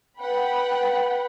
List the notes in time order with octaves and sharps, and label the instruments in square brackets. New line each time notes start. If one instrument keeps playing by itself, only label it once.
[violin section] B4 F#5 G5 B5